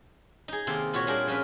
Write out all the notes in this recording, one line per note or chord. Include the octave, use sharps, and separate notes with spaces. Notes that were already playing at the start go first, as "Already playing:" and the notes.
D#4 G#4
C3 D#3 A#3 A4 C6
A#2 F4 F#4 C#5 A#5
G3 A#3 D4 G#4 A#4 C5
F3 C#4 F4 A#4 B4